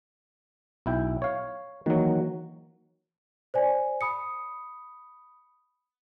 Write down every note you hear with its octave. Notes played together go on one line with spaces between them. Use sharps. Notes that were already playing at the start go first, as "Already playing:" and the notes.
B1 E4 G5
C#5 F5
D#3 E3 F#3 A#3 F#4
C5 D5 G#5
B5 D#6 C#7